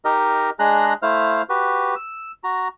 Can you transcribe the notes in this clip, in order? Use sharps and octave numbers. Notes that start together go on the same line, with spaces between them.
D#4 G4 A#4 D#5
G#3 D4 G#4 D#5 A#5 F#6
A3 E4 C5 F5 F6
F#4 G4 B4
E6
F#4 A#5